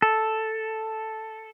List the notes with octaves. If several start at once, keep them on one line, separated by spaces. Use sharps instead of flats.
A4